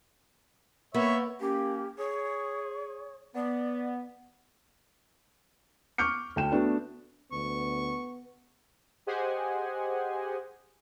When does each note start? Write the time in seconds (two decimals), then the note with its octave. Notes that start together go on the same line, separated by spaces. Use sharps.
0.94 A#3 B3 C#5 E5
1.41 A#3 C#4 G4
1.98 G#4 C#5
3.35 B3 D5
5.98 C#6 D6 F6 G6 C#7
6.36 D2 G5 E7
6.52 A3 B3 D4 F#4
7.32 D2 B3 C#6
9.07 G4 G#4 C5 D#5 F#5 G#5